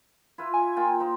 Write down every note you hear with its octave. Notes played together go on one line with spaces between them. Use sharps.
E4 F4 B4
G#5
A#3 F4 G5
A#3 D#4 C5